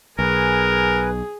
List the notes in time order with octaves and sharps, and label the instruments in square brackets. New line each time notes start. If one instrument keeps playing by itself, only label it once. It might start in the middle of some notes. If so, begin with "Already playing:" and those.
[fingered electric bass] B1 [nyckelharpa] G#4 [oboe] A#4 [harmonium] B4 G#5